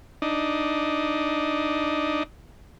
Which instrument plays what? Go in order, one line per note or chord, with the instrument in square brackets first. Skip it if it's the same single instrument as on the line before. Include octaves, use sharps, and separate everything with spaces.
[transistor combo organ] D4 D#4